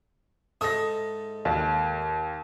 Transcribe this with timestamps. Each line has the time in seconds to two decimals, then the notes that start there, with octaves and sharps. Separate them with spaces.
0.61 G#2 A4 E5 D#6 A#6
1.45 D#2